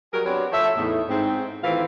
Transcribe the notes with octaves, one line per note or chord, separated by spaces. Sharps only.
F#3 G3 G#4 A#4
F#3 B3 C4 D4 G4 C#5
F3 A4 C#5 E5
E2 A2 D#4
G#2 C4
A2 D#3 E3 C4 F4 F5